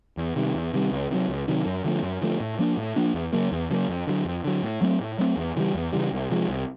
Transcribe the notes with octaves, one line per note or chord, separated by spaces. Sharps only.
E2
C3 D#3 G3
E2
C3 D#3 G3
C#2
C3 D#3 F#3
C#2
C3 D#3 F#3
F#2
D3 F3 A3
F#2
D3 F3 A3
A2
F3 A#3 D4
A2
F3 A#3 D4
E2
C#3 F#3 A#3
E2
C#3 F#3 A#3
F2
D3 F#3
F2
D3 F#3
A2
F#3 A3 C4
A2
F#3 A3 C4
E2
C#3 E3 G3
E2
C#3 E3 G3
C2
C3 F3 G#3
C2